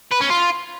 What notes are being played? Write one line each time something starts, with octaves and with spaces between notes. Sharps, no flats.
B4
C#4
F4